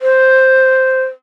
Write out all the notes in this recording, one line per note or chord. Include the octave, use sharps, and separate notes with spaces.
C5